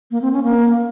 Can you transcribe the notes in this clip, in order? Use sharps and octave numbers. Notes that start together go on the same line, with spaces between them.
A#3
C4
C#4
A#3